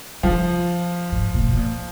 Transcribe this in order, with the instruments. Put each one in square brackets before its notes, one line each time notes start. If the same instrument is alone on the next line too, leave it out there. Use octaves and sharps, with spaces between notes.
[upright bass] C#3 [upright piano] F3
[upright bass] G#2
A#2
B2
A#2